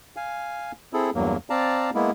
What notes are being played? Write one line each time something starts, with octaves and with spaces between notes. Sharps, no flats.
F5 G#5
C4 E4 G#4 A4
E2 G2 F#3 A#3
C4 D5 F5 A5 A#5
G#3 A#3 B3 E4